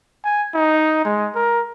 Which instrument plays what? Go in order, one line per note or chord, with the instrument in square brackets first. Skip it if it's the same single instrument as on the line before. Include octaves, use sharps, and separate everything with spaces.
[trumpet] G#5
D#4
G#3
A#4